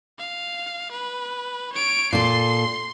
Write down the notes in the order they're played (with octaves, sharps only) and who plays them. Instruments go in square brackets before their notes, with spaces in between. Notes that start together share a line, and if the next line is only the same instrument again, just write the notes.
[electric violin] F5
B4
C#5 D7
[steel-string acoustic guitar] A#2 A4 [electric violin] C6 C7